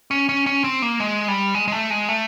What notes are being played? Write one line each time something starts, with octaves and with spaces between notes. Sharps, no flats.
C#4
C#4
C#4
C4
A#3
G#3
G3
G#3
G#3
A3
G#3
A3